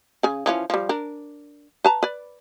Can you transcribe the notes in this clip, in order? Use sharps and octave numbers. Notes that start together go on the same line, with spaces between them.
C#3 G#5
E3 F3 C#4
F3 G3
D4 A#4
B4 A5 A#5
B4 D5